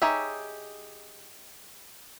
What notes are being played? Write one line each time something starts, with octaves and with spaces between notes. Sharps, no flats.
D#4 G4 G#4 C#5 E5